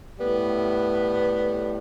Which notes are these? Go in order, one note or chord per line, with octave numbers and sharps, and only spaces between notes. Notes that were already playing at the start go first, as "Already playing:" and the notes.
A2 G3 B3